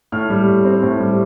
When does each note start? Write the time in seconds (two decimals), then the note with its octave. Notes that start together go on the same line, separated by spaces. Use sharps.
0.12 A2 F6
0.30 G3
0.47 A2
0.65 C4
0.83 A2
1.00 G3